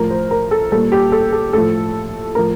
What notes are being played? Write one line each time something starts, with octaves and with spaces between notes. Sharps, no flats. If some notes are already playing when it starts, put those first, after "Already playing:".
Already playing: A2 F3 A#4
C5
A#4
A4
A#2 G3 A4
G4
A4
A4
A2 F3 A4
A2 F3 A#4